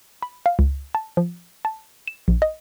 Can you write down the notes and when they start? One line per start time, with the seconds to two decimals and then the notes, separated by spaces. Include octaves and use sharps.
0.22 B5
0.46 F5
0.59 C#2
0.95 A5
1.17 F3
1.65 A5
2.08 E7
2.28 A#1
2.42 D#5